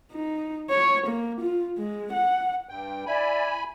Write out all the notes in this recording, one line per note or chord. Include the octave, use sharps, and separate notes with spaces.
D#4
C#5
A#3
F4
G#3
F#5
G2 G5
E4 D5 G#5 B5